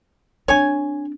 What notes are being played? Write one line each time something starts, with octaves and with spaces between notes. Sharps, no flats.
C4 D4 C#5 G#5